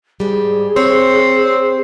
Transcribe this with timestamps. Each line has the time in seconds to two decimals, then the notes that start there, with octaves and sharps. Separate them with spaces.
0.20 G#2 G3 G#4
0.76 C4 C#5